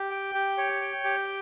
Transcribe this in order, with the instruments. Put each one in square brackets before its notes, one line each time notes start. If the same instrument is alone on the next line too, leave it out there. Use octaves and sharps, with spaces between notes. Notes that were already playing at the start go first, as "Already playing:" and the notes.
Already playing: [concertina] G4
G5
G4
C#5
G5
G4